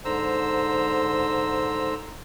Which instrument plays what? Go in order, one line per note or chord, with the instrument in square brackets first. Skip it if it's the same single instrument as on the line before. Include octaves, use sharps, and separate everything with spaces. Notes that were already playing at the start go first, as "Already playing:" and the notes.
[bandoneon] G#2 D3 C5 A#5 E6